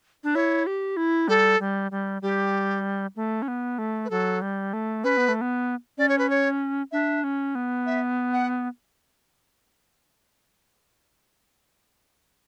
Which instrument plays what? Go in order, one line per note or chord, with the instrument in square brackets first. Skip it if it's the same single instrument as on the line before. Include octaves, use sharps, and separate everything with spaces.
[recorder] D4
[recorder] E4 [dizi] C#5
[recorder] G4
E4
[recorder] G3 [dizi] A4
[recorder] G3
G3
[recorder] G3 [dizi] G4
[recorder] A3
C#4
B3
A3
[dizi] B4
[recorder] F#3 [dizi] A4
[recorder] G3
A3
[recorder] C#4 [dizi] B4
[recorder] B3
A3
B3
[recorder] C#4 [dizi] D5
[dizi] C#5
B4
C#5
[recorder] D4 [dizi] E5
[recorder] C#4
B3
[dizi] E5
F#5